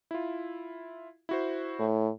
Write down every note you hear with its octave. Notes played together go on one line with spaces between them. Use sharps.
E4 F4
E4 F#4 C5
A2